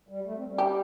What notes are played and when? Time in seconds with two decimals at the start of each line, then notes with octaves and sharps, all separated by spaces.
0.09 G3
0.25 A3
0.36 C4
0.48 G3
0.58 G4